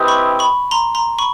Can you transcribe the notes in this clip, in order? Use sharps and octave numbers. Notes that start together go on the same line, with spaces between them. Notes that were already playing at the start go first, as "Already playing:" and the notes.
Already playing: C4 E4 G4 B4 D#5
B5 C#6
B5 C#6
A#5 C6
A#5 C6
B5 C#6